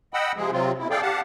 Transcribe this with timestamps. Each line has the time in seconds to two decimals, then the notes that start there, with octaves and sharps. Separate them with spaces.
0.14 D#5 F#5 G5 B5 E6
0.37 C3 F3 G#3 G#4
0.52 C3 F#3 C4 F4
0.78 B2 E4
0.90 G#4 A4 D5 F5 G5
1.02 G4 F5 F#5 A5